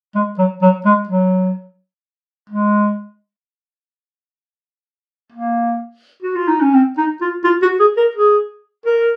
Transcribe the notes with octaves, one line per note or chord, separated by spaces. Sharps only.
G#3
F#3
F#3
G#3
F#3
G#3
A#3
F#4
F4
D#4
C#4
C4
D#4
F4
F4
F#4
G#4
A#4
G#4
A#4